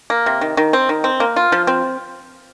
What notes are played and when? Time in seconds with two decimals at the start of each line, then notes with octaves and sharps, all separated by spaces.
0.10 A#3
0.26 C3
0.41 D#3
0.57 D#3
0.73 C4
0.89 D#3
1.04 C4
1.20 A#3
1.36 F4
1.52 F3
1.67 C4